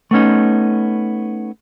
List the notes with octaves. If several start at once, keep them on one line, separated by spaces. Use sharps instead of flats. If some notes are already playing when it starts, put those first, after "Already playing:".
A3 B3 C#4 D#4